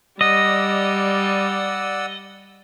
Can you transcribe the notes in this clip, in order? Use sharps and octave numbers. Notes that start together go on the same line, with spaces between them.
G3 D5 D#5 F#5 E6